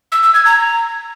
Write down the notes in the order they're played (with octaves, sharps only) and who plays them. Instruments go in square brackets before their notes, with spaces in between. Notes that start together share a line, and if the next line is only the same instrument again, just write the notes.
[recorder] E6
E6
G#6
A#5